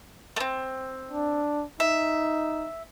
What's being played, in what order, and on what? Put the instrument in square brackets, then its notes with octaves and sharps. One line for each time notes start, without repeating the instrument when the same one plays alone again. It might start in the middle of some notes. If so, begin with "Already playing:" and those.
[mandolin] A3 C4
[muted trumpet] D4
[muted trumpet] D#4 [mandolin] E5